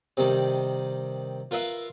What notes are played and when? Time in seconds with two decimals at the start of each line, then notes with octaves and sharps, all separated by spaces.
0.17 C3 D#3 G3
1.51 F4 A#4 B4 E5 F5